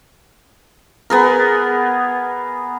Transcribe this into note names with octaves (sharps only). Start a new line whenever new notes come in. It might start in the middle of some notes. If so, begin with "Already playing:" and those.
B3 G#4 A#4